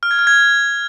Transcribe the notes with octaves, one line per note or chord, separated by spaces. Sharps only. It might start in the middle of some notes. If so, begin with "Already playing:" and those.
F6
G#6
F6
G#6